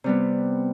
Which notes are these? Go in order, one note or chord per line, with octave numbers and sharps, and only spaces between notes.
C3 G3 B3